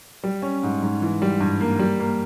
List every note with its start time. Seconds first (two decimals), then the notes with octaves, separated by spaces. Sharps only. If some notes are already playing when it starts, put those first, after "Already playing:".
0.24 G3
0.42 C#4
0.63 G#2
0.82 G#2
1.02 E3
1.22 G3
1.41 G2
1.60 A#3
1.79 G3
2.00 A#3